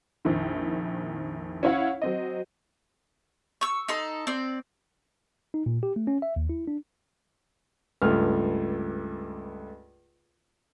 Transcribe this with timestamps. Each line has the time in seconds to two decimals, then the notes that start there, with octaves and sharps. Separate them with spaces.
0.25 A#1 F2 D#3 E4
1.63 C#4 E4 C#5 F5 F#5
2.02 F#3 C4 D#5
3.61 C#6 E6
3.88 D#4 A4 C6
4.27 C4 D5
5.54 D#4
5.66 A#2
5.83 G4
5.96 A3
6.07 C#4
6.22 E5
6.36 D#2
6.49 E4
6.68 D4
8.02 C#2 G2 A3 F6